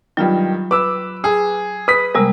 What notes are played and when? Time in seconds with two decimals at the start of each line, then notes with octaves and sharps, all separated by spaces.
0.17 G2 D#3 F#3 F4
0.71 B4 D6 E6
1.24 G#4
1.88 B4 D#6 B6
2.15 C3 G3 G#3 A#3